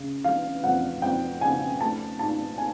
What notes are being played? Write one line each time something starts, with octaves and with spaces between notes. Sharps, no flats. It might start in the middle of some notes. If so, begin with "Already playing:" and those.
Already playing: C#3
E3 F5
F2 F#5
F2 G5
C#3 G#5
A3 A5
G#2 A5
G#5